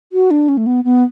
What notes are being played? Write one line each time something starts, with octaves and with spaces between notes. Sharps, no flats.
F#4
D4
C#4
A3
B3
B3